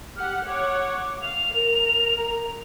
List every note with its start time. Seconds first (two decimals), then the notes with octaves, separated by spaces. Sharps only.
0.17 G4 F#5 F6
0.47 C#5 F#5 D6
1.22 F5 F7
1.53 A#4
2.18 A#5